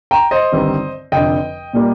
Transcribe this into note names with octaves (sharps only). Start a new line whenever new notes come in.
G5 A#5
C5 D#5
G1 G2 D#3 G3 C4
F1 F2 D3 D#5 G5
A#2 G3 A#3